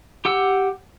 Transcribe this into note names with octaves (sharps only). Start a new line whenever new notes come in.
G4 F#5 E6